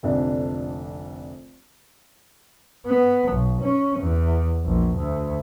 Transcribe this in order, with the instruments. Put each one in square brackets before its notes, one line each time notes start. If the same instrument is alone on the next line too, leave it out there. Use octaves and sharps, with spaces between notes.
[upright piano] F1 A#1 F2 D3 D4
[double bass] B3
B1
C#4
E2
A#1
D2